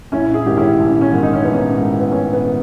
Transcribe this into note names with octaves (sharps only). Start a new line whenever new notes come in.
A#1 C#4 E4
E4 G#4
G#2 D#3 G4
C#4 E4
A#1
C#4
G#2 D#3
D#4
C#4
A#1 B3
C#4
G#2 D#3
B3
A#1 C#4
B3
D#3